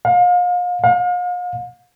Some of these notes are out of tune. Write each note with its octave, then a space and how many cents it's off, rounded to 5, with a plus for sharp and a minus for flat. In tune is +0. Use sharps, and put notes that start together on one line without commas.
F5 +35
F5 +40